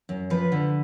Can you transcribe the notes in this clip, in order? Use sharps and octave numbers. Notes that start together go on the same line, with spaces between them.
F#2
F3 B4
D3